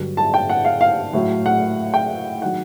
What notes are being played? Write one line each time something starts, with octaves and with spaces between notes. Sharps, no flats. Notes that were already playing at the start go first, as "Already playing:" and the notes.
Already playing: G2 D3 F#3
A5
G5
F#5
F5
F5
A2 F#3
F#5
G5
D#3 F#3 F#5